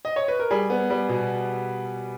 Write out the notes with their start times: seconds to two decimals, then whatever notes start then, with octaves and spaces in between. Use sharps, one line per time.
0.05 D#5
0.16 C#5
0.28 B4
0.39 A#4
0.51 G3 G#4
0.70 B3
0.90 G3
1.09 B2